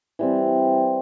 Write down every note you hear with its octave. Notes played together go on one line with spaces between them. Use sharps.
E3 G3 C4